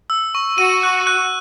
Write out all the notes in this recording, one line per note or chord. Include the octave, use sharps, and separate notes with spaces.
E6
C#6
F#4 D#7
F#6
F#6